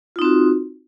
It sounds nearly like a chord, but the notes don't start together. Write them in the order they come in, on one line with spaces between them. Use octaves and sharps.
F4 D#4 C4 F#4